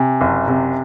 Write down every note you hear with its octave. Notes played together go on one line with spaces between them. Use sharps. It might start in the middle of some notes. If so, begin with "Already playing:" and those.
Already playing: C3 G#5
F#1
C3